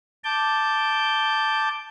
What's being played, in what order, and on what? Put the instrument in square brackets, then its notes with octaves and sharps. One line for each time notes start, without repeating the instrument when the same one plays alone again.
[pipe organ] A5 D6 G6